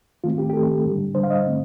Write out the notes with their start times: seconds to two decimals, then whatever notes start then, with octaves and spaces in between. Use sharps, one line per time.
0.24 D#3 A3 C4 F4
0.38 G4
0.50 G4
0.53 D#3 A3 C4 A4
0.84 D3 G3 D4
1.15 D3 G3 D4 C5
1.23 F5
1.30 D#5
1.45 D3 A3 C4